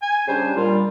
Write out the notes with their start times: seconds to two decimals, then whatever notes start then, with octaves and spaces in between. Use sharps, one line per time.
0.02 G#5
0.28 C#3 G3 D4 C5
0.56 A#2 G3 F4